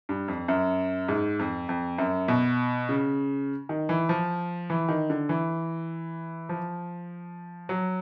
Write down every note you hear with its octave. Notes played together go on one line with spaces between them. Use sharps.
G2
F2
F#2
G#2
F2
F2
F#2
B2
C#3
D#3
E3
F3
E3
D#3
D3
E3
F3
F#3